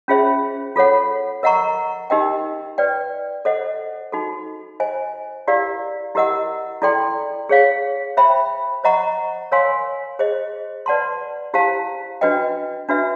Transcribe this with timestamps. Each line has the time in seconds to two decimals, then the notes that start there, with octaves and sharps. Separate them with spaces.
0.08 C#4 F4 G#4 C5 E5
0.76 F4 A4 C#5 F#5
1.43 A#4 D#5 F#5 A#5 C#6
2.10 D#4 G4 A#4 D#5 G5
2.78 B4 D5 G5
3.45 A4 C5 D#5 F#5
4.12 D#4 F#4 A4
4.80 C5 D#5 G#5
5.47 E4 G4 A#4 D5 F5
6.15 E4 G4 A#4 D#5 F#5
6.82 E4 A4 D5 G5 C6
7.49 G#4 C#5 F5
8.17 C5 E5 G5 B5
8.84 C5 D#5 F#5 A#5 C#6
9.52 A#4 C#5 F5 G#5 C6
10.19 G#4 C5 D#5
10.86 B4 D5 F#5 A5 C6
11.54 E4 G4 C5 F5 A5
12.21 D4 F#4 B4 D#5 G5
12.89 D4 F#4 B4 E5